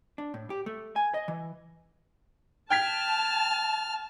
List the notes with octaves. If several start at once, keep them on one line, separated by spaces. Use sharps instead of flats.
D4
A2
G4
A3
G#5
D#5
E3
G5 A5 F6 G#6 B6